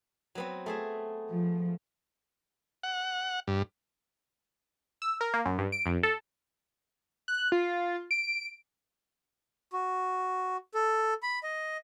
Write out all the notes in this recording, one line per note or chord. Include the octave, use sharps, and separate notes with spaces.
F#3 B3 C4
A3 G#4 E5
F3
F#5
G2
E6
A#4
A#3
F#2
G2
D7
F2
A4
F#6
F4
D7
F#4
A4
B5
D#5